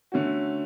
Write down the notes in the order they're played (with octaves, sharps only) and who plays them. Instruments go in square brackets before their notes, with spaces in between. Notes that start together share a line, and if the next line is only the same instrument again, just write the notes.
[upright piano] D3 A3 C#4 F#4